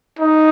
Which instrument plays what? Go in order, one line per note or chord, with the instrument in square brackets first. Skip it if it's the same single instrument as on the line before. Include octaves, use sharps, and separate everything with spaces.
[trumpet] D#4